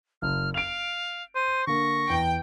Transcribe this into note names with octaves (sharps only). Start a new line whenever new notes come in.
F#1 F6
F5 D7 F7
C5 D#7
D3 A#3 C#6 A#6
E2 G5